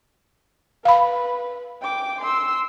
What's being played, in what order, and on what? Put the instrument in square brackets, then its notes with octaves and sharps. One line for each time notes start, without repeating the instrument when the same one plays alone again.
[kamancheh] B4 [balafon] F5 B5
[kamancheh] G5 D6
C6 E6